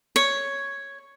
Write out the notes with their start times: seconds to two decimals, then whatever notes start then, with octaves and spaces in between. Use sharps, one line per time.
0.16 C#5